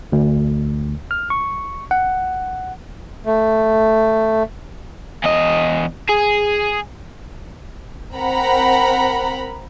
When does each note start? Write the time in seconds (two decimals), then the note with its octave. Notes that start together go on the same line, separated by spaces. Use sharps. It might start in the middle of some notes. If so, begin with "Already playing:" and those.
0.12 D2
1.11 F6
1.30 C#6
1.91 F#5
3.26 A3
5.24 E2 D#5
6.09 G#4
8.15 C4 A#4 F#5 A#5 B5